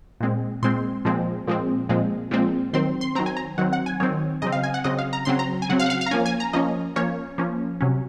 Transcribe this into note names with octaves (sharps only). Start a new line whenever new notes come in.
A#2 G#3 C4
A#2 G#3 C4 C6
A#2 F3 G#3 C4
A#2 F3 G#3 C4
A#2 F3 G#3 C4
A#2 F3 G#3 C4
D#3 F#3 C4 C6
C6
D#3 F#3 C4 A#5
G#5
A#5
D#3 F#3 C4 F#5
F#5
G#5
D#3 F#3 C4 C#5
C#3 F#3 C4 D#5
F5
G#5
F#5
C#3 F#3 C4 D#5
F5
A#5
C#3 F#3 C4 C6
A#5
G#5
C#3 F#3 C4 F#5
F5
F#5
F5
F5
A#5
F3 A#3 C#4 G#5
G#5
A#5
F3 A#3 C#4 D#5
F3 A#3 C#4 C#5
F3 A#3 C#4
C3 F#3 C#4